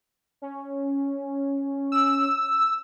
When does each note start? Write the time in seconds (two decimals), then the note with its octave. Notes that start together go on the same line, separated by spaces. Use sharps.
0.42 C#4
1.92 E6